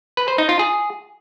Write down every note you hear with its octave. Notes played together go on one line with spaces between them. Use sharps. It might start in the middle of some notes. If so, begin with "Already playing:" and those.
B4
C5
D#4
F4
G#4